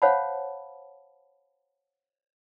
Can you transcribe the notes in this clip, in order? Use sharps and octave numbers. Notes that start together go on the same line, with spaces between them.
C5 C#5 F5 F#5 A5 B5